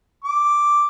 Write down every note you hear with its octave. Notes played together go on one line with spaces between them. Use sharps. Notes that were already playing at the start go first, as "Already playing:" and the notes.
D6